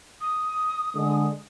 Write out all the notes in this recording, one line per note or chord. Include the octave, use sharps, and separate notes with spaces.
D#6
D3 G#3